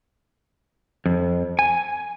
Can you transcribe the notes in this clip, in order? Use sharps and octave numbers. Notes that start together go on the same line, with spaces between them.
F2
G#5